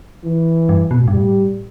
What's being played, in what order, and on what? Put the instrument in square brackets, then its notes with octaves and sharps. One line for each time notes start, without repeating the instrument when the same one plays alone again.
[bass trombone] E3
[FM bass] G2
B2
A2
G2
[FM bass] A2 [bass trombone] G3